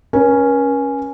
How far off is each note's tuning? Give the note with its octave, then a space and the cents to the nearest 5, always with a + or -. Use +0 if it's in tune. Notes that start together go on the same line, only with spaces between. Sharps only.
C#4 +0 A#4 +45